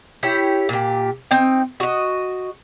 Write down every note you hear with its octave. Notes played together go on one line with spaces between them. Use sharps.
E4 G4 C#5
A#2 G4
C4 D#4 G5
F#4 D#5